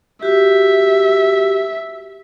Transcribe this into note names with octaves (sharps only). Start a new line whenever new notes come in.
F#4 G4 E5